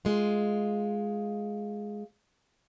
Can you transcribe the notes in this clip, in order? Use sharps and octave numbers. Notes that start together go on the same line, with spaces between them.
G#3 F4